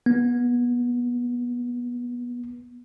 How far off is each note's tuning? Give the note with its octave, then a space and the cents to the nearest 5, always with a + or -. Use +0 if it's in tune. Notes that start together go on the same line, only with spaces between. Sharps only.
B3 -25